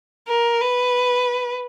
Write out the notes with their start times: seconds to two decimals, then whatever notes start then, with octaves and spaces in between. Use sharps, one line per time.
0.27 A#4
0.61 B4